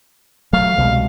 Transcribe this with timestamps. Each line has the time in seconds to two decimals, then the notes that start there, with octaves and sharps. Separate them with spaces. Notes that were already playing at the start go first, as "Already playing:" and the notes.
0.53 F#3 A3 F5
0.78 C2 B2 G#3